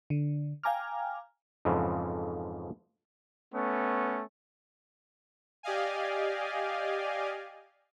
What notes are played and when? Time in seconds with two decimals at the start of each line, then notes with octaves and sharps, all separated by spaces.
0.10 D3
0.63 F5 G5 G#5 A#5 D6 F6
1.65 F2 G#2 C#3 E3 F3
3.53 A3 B3 C#4
5.63 G4 D5 D#5 F5 G#5